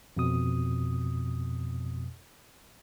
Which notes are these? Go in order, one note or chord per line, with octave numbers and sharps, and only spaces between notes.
F2 B2 D#6